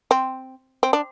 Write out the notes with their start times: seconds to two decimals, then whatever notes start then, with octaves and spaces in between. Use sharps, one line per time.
0.11 C4
0.83 C4
0.93 D4